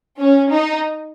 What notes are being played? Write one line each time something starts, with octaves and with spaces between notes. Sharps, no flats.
C#4
D#4